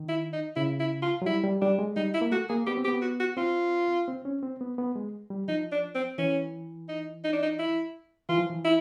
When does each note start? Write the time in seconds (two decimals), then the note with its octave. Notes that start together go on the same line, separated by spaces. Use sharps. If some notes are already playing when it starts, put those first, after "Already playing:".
Already playing: D#3
0.09 E4
0.33 D#4
0.56 C#3 E4
0.80 E4
1.02 F4
1.22 F#3
1.26 G3 E4
1.44 G3
1.61 G3 D4
1.79 G#3
1.96 G3 D#4
2.14 E4
2.21 A#3
2.32 A3 F#4
2.49 A#3 G#4
2.67 B3 G4
2.77 C4
2.85 G4
2.88 B3
3.02 F#4
3.20 F#4
3.37 C4 F4
4.08 C4
4.25 C#4
4.43 C4
4.61 B3
4.78 B3
4.96 G#3
5.30 G3
5.48 F3 D#4
5.72 D4
5.95 C4
6.18 E3 C#4
6.89 D#4
7.24 D#4
7.33 D4
7.43 D#4
7.59 E4
8.29 E3 F4
8.39 F3
8.50 E3
8.65 E4